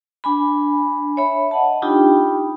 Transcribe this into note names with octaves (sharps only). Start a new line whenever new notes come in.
D4 G#5 B5
C#5 E5 B5
D#5 F#5 A5
D4 D#4 F4 G4 G5 B5